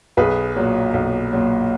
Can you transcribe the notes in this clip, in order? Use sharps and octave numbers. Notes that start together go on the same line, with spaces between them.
B1 G#4 B4
A#2 F#3
B1
A#2 F#3